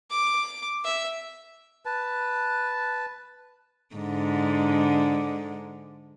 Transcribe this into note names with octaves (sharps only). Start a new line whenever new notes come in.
D6
E5
B4 A5
G#2 D3